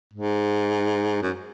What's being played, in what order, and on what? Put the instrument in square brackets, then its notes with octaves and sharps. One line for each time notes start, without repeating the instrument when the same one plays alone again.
[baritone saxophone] G#2
F#2